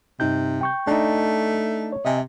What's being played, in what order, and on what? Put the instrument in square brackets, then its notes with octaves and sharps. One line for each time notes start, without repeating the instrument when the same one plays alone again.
[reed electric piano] G2 D#4 G6 [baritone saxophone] C3
[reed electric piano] G5 C#6 G6
[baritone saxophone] A3 [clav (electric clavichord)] D4 D#4
[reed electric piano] C#5
[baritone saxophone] C3 [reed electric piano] D#5 E5 G#5